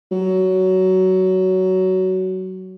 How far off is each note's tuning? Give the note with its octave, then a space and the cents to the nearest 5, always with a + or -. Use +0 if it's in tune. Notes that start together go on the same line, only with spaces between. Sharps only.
F#3 +15